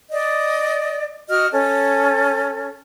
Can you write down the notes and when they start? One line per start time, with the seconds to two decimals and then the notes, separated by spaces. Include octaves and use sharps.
0.11 D5 D#5
1.27 F#4 D#5 F6
1.52 C#4 A4